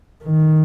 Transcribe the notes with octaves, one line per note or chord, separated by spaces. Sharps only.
D#3